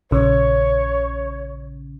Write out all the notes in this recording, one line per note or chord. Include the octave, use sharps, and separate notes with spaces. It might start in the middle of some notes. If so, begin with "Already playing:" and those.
A#1 C#3 C#5